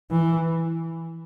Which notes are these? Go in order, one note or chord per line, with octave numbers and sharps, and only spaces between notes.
E3